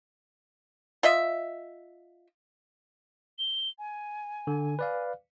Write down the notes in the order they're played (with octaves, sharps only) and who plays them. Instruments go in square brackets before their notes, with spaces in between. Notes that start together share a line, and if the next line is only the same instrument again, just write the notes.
[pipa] F4 D#5 E5
[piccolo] G7
G#5
[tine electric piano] D3
B4 D5 F5